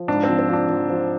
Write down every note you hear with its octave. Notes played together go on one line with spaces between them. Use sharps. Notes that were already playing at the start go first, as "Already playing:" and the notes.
Already playing: F3
G#2 D4
F3 C4
C4
F3 D4
F3
F3